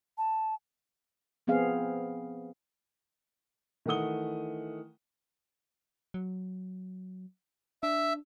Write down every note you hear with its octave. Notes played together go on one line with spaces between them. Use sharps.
A5
F3 B3 C4 G#4 F5
D#3 E3 A3 F#5 D#6 G7
F#3
D4 E5